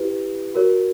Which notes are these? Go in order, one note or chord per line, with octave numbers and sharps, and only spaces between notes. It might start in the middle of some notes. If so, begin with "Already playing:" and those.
Already playing: E4 G4 B4
F#4 A#4 C#5